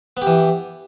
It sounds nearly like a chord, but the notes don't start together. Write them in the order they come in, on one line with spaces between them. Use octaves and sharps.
B3 G4 E3